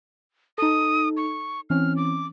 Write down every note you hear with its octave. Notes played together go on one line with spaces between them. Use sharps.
D#4 A4 D#6
C#6
E3 C4 C#4 F6
D6